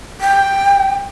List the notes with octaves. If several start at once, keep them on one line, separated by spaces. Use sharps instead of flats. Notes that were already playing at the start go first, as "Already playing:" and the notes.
G5